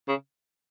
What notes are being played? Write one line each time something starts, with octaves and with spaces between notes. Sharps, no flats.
C#3